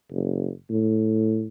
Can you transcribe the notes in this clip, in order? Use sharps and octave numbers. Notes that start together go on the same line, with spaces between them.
F#1
A2